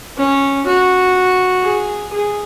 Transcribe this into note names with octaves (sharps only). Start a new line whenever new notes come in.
C#4
F#4
G#4
G#4